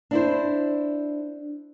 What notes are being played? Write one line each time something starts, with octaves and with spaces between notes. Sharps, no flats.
D4 E4 C5